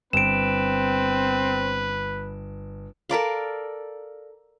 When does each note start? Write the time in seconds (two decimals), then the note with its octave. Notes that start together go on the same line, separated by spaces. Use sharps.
0.13 G1 C4 B4 D7 E7
3.09 A4 A#4 D5 F5